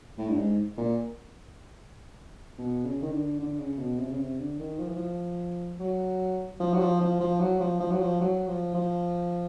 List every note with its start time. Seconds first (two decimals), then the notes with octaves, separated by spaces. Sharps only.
0.18 A2
0.29 G2
0.38 G#2
0.77 A#2
2.58 B2
2.85 C#3
3.02 D#3
3.12 D3
3.39 D3
3.59 C#3
3.79 B2
3.99 C3
4.11 C#3
4.19 C3
4.39 D3
4.60 D#3
4.79 F3
4.88 E3
4.96 F3
5.80 F#3
6.60 F3
6.73 F#3
6.80 F3
7.00 F3
7.20 F3
7.40 F#3
7.60 F3
7.80 F3
7.91 F#3
8.01 F3
8.21 F#3
8.47 F3
8.74 F3